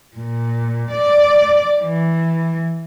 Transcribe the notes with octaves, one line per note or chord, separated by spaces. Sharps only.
A#2
D5
E3